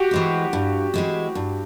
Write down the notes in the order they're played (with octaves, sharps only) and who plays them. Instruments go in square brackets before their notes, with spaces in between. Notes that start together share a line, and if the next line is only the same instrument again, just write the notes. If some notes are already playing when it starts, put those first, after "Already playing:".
Already playing: [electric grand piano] F#4 G4
[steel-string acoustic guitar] E3 G#3 C4
G2
E3 G#3 C4
G2